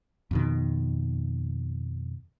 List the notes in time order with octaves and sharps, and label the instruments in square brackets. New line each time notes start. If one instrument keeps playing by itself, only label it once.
[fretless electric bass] F2 B2 D#3